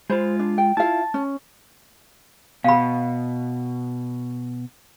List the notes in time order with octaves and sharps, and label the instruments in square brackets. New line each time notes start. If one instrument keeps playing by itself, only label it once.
[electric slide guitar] G#3 F4 [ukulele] C5 B5
[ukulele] D4
G5
[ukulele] E4 F4 F5 [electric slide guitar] A5
[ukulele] C#4
[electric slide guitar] B2 [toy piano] F5 B5